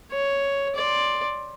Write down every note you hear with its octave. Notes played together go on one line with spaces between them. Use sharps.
C#5
D5 C6